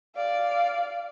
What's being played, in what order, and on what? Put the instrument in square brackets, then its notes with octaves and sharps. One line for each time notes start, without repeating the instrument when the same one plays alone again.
[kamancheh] D5 F5